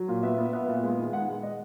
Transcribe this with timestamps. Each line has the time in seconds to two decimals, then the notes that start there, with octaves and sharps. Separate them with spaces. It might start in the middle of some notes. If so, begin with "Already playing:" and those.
Already playing: F#3
0.08 A#2
0.23 B3 E5
0.38 B3
0.53 B3 E5
0.68 A#2
0.83 G#3
0.98 D#3
1.13 G#3 F#5
1.28 G#3
1.43 D#5